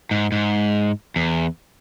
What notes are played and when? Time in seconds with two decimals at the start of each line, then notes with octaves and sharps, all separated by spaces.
0.11 G#2
0.32 G#2
1.16 E2